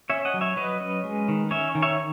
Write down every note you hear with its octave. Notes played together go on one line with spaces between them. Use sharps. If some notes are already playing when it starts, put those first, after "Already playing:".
C#4 C#5 E5
D#5 F#5
F#3
C#5 E5
F#3 B4 D#5
C#4
G#3
D#3
C#4 C#5 E5
D#3
C#5 E5